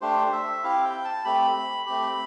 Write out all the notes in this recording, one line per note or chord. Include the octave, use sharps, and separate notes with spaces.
A3 D4 G4 C5
E5
C4 E4 G4 F5
G5
A5
A3 C4 G4 B5
A3 C4 G4